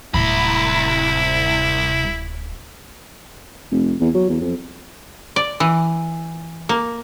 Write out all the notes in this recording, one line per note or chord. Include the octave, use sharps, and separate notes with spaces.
D1 C2 E4 B5
F1
E2
F#3
E2
F2
D5
E3
A#3